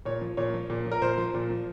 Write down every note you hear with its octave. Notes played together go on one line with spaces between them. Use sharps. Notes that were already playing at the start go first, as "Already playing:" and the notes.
A#2 C#5
F3
A#2 C#5
F3
A#2
F3
A#4
A#2 C5
F3
A#2
F3